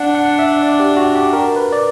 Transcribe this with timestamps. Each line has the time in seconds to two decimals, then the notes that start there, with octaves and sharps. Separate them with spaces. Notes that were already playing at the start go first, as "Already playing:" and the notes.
Already playing: D4 F#5
0.15 F#5
0.39 E5
0.62 D5
0.80 G4
0.97 F#4
1.15 G4
1.33 A#4
1.56 B4
1.73 D5